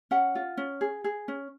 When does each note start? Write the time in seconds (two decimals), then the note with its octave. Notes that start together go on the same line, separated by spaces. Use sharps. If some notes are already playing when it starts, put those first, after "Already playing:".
0.11 C#4 F#5
0.35 F4
0.57 C#4
0.81 G#4
1.04 G#4
1.28 C#4